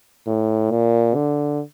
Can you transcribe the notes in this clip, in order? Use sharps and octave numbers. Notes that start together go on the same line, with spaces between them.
A2
A#2
D3